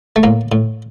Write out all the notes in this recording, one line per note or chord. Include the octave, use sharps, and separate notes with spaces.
A3
A2 A#3
A2